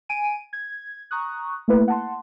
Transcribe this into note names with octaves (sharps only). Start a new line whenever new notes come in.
G#5 D7 D#7
G#6
A#5 C#6 D#6 F#6
A3 A#3 E4 B4
F#5 A5 C6